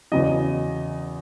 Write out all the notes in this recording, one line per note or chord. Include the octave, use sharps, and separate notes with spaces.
E2 C#3 F#3 D#5